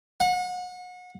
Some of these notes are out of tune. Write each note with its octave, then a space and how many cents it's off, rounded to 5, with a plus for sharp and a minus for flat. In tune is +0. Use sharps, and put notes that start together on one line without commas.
F#5 -35